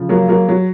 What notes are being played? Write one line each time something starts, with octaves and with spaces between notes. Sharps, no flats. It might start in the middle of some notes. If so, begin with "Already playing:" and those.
Already playing: C#3 F3
F#3 A#3
F#3 A#3
F#3